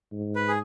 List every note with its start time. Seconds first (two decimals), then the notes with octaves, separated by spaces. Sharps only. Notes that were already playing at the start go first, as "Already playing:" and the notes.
0.12 G#2
0.36 B4
0.48 G#4